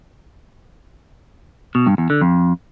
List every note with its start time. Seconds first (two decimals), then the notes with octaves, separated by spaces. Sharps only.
1.75 B2
1.87 G2
1.98 E2
2.10 D3
2.21 F2